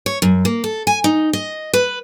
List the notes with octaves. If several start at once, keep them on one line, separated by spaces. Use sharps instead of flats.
C#5
F#2
A#3
A4
G#5
D#4
D#5
B4